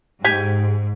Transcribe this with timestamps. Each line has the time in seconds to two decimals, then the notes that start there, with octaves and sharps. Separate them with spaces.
0.24 G#2 G4 G#5